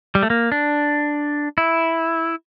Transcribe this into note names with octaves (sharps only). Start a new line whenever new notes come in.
G3
A3
A#3
D4
E4